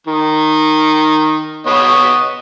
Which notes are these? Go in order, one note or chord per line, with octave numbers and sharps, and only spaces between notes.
D#3
B3 C#5 D#5